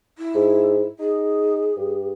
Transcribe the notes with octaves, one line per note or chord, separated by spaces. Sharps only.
E4
G#2
D#4 G#4
G2